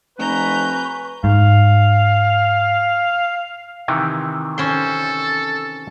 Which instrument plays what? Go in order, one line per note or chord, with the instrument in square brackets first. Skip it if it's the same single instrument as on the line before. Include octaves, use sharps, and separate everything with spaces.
[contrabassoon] F1 [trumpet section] B4 [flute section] G#5 C#6 [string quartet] A#5 G6
[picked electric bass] G#2 [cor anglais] F5
[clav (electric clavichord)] C3 D#3 E3
[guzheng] C#4 C5 C6 [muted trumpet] A4